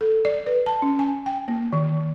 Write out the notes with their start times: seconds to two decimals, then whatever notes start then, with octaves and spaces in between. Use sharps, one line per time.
0.01 A4
0.25 D5
0.46 B4
0.66 A5
0.82 C#4
0.99 G#5
1.26 G5
1.48 A#3
1.73 D#3